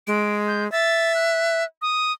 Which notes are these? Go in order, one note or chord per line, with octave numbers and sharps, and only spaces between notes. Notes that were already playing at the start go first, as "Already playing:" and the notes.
G#3 D7
G6
E5 A6
F#6
D#6